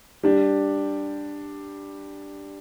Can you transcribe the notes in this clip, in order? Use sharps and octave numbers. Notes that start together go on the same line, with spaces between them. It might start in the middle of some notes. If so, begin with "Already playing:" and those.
G3 D4 G4